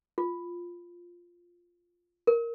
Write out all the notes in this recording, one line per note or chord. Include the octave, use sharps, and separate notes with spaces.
F4
A#4